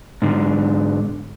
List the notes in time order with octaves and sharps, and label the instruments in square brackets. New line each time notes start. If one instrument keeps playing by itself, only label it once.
[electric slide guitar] G#2 D3